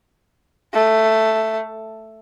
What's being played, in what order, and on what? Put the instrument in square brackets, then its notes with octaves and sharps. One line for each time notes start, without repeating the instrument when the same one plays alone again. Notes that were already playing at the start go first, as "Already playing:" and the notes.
[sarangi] A3